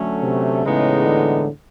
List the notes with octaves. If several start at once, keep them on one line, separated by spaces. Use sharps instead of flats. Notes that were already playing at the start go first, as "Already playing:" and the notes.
Already playing: D3 F#3 A3 C#4
C3
A2 C#3 E3 G#3 B3 D#4
D3